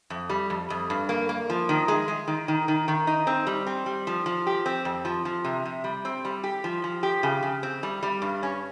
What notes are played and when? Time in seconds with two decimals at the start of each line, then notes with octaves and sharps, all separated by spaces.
0.10 F2
0.30 G3
0.50 F2
0.70 F2
0.90 G2
1.09 A#3
1.29 A#3
1.50 F3
1.69 D#3
1.88 G#3
2.08 G#3
2.28 D#3
2.48 D#3
2.68 D#3
2.88 D#3
3.07 D#4
3.27 C4
3.47 G3
3.67 C4
3.86 G3
4.07 F3
4.26 F3
4.47 G4
4.66 C4
4.85 F2
5.05 F3
5.25 F3
5.45 C3
5.65 C3
5.84 G3
6.05 C4
6.25 G3
6.44 G4
6.64 F3
6.84 F3
7.03 G4
7.23 C#3
7.43 C#3
7.63 C4
7.83 G3
8.03 G3
8.22 G2
8.43 C#4